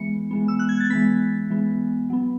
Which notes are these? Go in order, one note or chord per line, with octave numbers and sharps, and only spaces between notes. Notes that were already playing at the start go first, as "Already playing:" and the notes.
Already playing: E3 G#3 B3 C#7
E3 G#3 B3
E6
F#6
G#6
A6
E3 G#3 B3 B6
E3 G#3 B3
F#3 B3